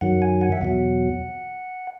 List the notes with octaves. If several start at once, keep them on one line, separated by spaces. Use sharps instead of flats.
F#2 D#3 F#3 F#5
G#5
F#5
E5
E2 B2 F#3 F#5